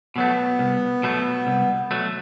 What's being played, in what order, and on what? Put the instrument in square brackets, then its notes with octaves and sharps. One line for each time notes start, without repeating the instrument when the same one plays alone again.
[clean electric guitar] B2 F#3 A3 [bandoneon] B3
[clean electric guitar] C2
B2 F#3 A3
C2
B2 F#3 A3